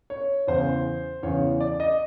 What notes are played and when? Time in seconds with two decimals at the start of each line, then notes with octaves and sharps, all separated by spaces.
0.10 C#5
0.47 E2 C#3 E3 C5
1.23 E2 C#3 E3 C#5
1.61 D5
1.80 D#5